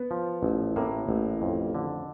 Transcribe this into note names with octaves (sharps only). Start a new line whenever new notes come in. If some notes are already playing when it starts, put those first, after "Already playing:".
Already playing: B3
F3
A1
A2 A#3
A1
F2
D3